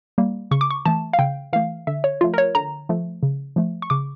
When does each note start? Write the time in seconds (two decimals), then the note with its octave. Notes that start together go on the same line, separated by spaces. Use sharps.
0.18 G3 A#3
0.51 C#3 C#6
0.61 D6
0.71 C#6
0.85 E3 A3 A5
1.13 F5
1.19 C#3 G5
1.53 E3 A3 F5
1.87 D3 E5
2.04 C#5
2.21 F3 A3 F4
2.34 A#4
2.38 C#5
2.55 D3 A#5
2.89 F3 A3
3.23 C#3
3.56 F3 A3
3.82 C#6
3.90 C#3 D6